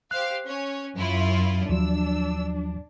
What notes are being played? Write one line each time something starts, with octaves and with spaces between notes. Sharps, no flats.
G4 C5 F5 F#6
C#4 C#5
F#2 E4 F4
D#2 F3 F#3 D4 E6